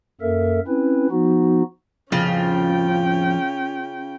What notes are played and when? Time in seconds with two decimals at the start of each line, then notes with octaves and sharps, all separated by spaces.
0.21 F#2 A#3 A4 A#4 E5
0.67 C4 C#4 E4 B4
1.11 F3 B3 D#4 F#4
2.12 F2 A2 C#3 C#4 F4 G5